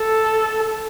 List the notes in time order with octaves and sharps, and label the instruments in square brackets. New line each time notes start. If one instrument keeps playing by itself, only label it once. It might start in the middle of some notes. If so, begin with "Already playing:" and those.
Already playing: [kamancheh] A4